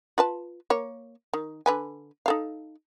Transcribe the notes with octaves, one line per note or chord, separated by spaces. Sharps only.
F4 B4 A5
A#3 C#5
D#3
D3 B4 G#5
D#4 A4 F5